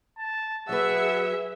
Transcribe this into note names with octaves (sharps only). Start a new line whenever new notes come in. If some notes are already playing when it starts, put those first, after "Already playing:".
A5
F#3 F#4 G#4 B4 E5 F#5